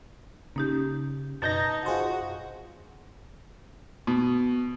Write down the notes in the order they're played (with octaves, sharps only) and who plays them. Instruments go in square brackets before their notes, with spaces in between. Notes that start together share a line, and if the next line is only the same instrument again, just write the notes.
[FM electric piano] C#3 [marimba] A#3 D#4 G4
[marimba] F#2 B2 [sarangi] D#4 [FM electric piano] A5 G6 A#6
[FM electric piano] F4 G#4 C5 [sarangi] F#4
[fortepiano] B2